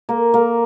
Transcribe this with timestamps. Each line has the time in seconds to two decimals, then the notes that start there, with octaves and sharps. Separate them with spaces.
0.09 A#3
0.34 A#3